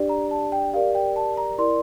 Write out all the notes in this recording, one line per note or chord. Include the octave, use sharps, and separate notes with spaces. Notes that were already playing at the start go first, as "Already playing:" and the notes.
Already playing: D4 G4 D5
A#5
A5
G5
G4 A#4 D5 F5
G5
A5
A#5
E4 A#4 D5 C6